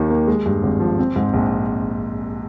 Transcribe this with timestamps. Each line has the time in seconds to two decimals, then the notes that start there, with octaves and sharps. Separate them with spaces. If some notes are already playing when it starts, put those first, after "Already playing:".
Already playing: D#2 D#3 D#4
0.10 A#3
0.28 G#3
0.46 G2
0.63 G#1
0.80 F3
0.99 C4
1.16 G#2
1.34 A#1